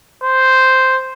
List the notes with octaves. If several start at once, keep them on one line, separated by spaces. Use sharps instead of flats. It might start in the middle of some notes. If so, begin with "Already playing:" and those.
C5